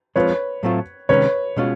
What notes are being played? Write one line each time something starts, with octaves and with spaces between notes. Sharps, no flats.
F3 G#3 C4 F4 B4 C#5
A2 F#3 A3 C4 F4
C3 D#3 G#3 C#4 B4 C#5
B2 G#3 C#4 F4